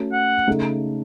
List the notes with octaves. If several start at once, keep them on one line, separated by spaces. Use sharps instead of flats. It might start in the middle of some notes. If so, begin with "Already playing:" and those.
Already playing: A3 C#4 F#4 A4
F#5
C#3 A3 D#4 A4